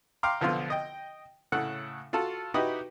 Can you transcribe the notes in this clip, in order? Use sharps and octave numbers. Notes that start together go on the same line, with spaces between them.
F5 G5 A#5 C6 D6 F6
B1 D3 F3 B3 F4 C6
D#5 G5
A2 C#3 A4 F#5
F4 F#4 A4 A5
D#4 E4 F#4 G4 B4 D#5